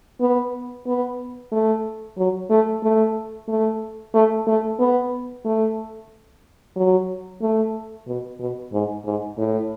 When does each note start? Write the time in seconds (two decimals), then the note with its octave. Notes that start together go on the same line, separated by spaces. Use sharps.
0.20 B3
0.86 B3
1.52 A3
2.17 F#3
2.50 A3
2.83 A3
3.48 A3
4.14 A3
4.47 A3
4.79 B3
5.45 A3
6.76 F#3
7.42 A3
8.07 B2
8.40 B2
8.72 G#2
9.05 G#2
9.38 A2